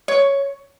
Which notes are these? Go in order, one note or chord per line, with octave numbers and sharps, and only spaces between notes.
C#5